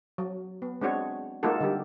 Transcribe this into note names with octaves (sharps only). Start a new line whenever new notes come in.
F#3
B3
G#3 C4 D4 F#4 C#5
G#3 A#3 D#4 F4 F#4 A4
D3 G3 G4